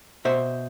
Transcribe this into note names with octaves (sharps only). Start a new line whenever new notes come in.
B2 C5 E5